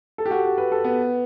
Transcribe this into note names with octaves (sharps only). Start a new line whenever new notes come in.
A4
G4
F#4
G4
B4
A4
B3